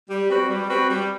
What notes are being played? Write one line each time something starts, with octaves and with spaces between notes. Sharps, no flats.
G3
C4 F#4 B4
G3
C4 F#4 B4
G3